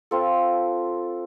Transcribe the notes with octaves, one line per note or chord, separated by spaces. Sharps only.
C4 F4 A4